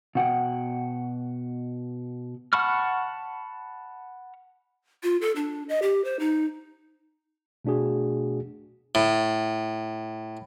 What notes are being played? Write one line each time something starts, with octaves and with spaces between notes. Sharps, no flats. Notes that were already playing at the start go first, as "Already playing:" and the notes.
B2 F#5 G5
F#5 A5 B5 C#6 F6
F4
A4
D4
D#5
G4
C5
D#4
B2 A3 D4 F#4 G#4
A2